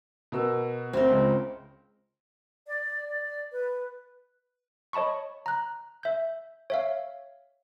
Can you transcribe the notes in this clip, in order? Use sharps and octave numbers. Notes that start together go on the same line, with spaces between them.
B2 A#4 E6
D2 C4 A#4
C#2 C#3
D5
D5
B4
C#5 D#5 A5 B5 C#6
A#5 F#6
E5 G6
C#5 E5 F5